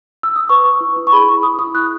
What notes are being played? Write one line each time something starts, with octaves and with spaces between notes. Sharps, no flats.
E6
D#6
B4 C#6
B4
E4
E4
C#6
G#4 B5
E4 C#6
E4 D#6
E4 D#6
E4 F#6